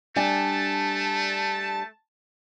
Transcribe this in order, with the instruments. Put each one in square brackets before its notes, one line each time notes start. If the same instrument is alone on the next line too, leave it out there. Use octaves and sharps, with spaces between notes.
[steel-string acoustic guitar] G3 D4 G#5 [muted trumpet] A3 [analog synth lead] A5